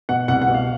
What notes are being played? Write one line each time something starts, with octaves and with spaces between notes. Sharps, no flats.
B2 F#5
C2 F#5
F#5
B2
F5